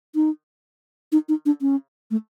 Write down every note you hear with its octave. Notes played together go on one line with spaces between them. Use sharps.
D#4
D#4
D#4
D4
C#4
A3